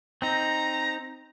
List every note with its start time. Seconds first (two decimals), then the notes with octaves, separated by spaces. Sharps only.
0.22 C4 D#4 A#5